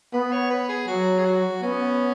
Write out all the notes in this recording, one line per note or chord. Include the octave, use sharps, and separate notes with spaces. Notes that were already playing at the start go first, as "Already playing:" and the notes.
B3 B4
C#5
B4
G#4
F#3 F#4
G#4
F#4
B3 C#4